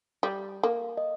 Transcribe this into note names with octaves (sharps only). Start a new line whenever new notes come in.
G3
A#3
D#5